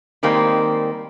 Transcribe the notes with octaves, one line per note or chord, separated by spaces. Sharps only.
D#3 G3 G#3 A#3 C4